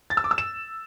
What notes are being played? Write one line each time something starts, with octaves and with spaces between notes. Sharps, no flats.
A6
E6
D6
E6
E7